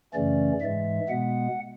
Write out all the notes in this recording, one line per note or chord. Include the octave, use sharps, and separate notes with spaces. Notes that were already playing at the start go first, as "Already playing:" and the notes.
F#2 C#3 E3 A3 C#4 D5
G#2 E3 G#3 E5
B2 G#3 B3 F#5